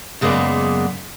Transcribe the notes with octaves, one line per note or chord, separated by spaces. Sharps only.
F#2 C#3 G#3 A#3 B3 D5